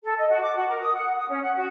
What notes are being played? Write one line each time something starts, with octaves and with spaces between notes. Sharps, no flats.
A4
D#5
F#4
D6
F#4
A#4
D#6
F#5
D#6
C#4
F#5
F#4